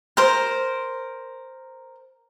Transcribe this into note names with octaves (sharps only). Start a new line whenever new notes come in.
A#4 C5